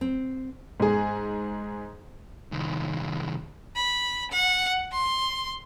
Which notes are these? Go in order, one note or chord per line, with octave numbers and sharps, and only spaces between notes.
C4
G#2 G#4
C2 D#3
B5
F#5
C6